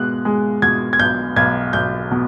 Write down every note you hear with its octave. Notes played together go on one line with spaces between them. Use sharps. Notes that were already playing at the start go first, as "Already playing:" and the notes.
Already playing: B2 G#3 F#6
G#3
B2 G#6
G#6
B1 G6
B1 G#6
B1 G6
B2